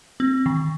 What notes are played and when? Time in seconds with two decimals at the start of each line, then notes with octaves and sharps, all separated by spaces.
0.20 C4
0.46 D#3